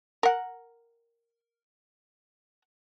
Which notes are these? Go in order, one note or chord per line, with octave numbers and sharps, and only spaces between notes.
A#4 F#5